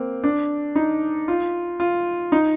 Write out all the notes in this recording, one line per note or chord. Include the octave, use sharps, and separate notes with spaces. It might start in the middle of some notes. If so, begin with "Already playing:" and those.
Already playing: A#3 C4
D4
D#4
F4
F4
D#4